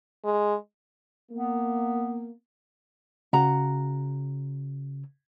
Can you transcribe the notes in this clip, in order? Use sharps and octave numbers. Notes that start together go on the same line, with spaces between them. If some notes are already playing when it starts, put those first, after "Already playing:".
G#3
A#3 B3
C#3 F#4 A#5